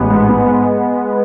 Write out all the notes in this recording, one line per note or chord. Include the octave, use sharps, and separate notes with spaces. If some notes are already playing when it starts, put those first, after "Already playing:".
Already playing: A1 G#3 B3
G#2
B3
G#2